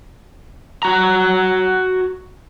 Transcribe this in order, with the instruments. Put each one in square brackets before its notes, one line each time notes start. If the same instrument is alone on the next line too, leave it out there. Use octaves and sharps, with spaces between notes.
[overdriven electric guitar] F#4 A#5